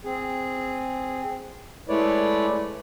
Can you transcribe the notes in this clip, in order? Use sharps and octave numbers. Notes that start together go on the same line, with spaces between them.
C4 G#4
G#3 A3 E4 B4 C#5 D5